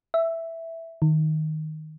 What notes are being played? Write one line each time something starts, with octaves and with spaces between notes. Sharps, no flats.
E5
D#3